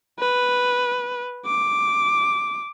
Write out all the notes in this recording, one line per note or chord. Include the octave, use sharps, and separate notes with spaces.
B4
D6